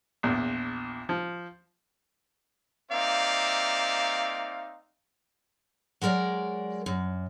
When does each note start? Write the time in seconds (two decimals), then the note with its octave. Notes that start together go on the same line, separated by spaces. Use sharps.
0.23 A#1 E2
1.09 F3
2.91 A#3 C4 D#4 D5 E5 F5
6.02 F#3 G#3 A#4 D5
6.86 F#2